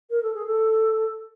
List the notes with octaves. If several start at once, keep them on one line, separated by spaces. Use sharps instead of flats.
A#4
A4
G#4
A4